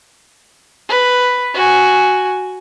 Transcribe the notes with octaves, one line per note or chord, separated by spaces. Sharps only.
B4
F#4 G#5